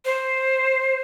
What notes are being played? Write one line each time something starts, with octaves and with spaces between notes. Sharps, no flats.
C5